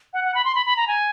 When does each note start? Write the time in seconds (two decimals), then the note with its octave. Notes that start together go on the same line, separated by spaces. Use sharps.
0.13 F#5
0.24 F#5
0.35 B5
0.45 C6
0.55 B5
0.66 B5
0.77 A#5
0.88 G#5